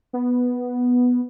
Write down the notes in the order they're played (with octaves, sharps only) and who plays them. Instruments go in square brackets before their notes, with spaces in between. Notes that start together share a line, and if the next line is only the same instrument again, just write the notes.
[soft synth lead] B3